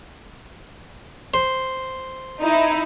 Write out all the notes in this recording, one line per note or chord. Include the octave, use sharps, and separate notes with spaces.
C5
D#4 E4